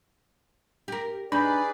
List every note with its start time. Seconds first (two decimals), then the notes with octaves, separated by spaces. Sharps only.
0.88 G4 A#4
1.32 D4 D#4 G#4 B4 D5 B5 G6